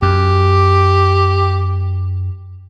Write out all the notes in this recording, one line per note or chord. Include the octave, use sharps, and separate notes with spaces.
F#2 G4